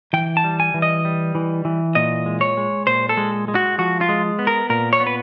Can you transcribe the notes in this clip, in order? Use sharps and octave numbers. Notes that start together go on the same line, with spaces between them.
E3 G5
A5
G3
G#5
E3
D#5
G3
E3
E3
A#2 D#5
G#3
C#5
G#3
A#2 C5
A4
G#3
G#3
F#4
F3 F#4
F4
G#3
B3
A#4
A#2 A#4
C#5
B3
B4